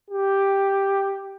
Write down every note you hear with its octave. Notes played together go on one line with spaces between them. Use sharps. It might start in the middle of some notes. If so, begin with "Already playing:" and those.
G4